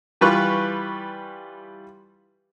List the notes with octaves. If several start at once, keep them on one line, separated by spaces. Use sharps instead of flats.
E3 G3 F4 B4 C#6